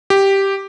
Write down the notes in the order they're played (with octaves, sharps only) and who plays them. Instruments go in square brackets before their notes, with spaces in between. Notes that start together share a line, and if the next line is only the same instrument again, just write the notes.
[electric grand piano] G4